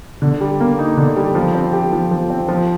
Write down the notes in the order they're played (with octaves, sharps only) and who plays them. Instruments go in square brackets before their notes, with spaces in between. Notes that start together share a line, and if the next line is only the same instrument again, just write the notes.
[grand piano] D3
G3
A#3
D#4
D3
G3
F3
C4
G4
F3
F3
C4
F3